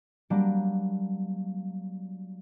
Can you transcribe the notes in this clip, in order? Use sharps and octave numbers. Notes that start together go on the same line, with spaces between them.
F#3 G3 A#3 D4